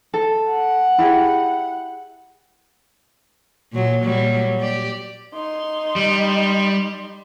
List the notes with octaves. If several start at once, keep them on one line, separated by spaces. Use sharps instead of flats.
A4
F#5
E4 G4 G#4
A#2 F#3
A#2 F#3 G3
G4 D5
D#4 C6
G3